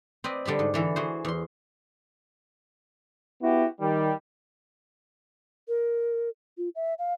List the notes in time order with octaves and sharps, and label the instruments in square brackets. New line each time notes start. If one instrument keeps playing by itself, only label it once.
[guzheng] C4 B4 D5 D#5
D3 G3 A5 B5
G#2
D3 E3 A4
E3 F#4 G#4 C5
E2 C6
[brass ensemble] B3 E4 F#4 G4
D#3 G3
[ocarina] A#4
F4
E5
F5